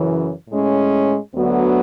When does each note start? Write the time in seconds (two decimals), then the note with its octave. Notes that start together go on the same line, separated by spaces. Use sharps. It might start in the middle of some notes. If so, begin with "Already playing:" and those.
Already playing: F#2 C#3 E3
0.49 A2 G#3 C#4
1.34 D2 D3 F#3 B3 F#4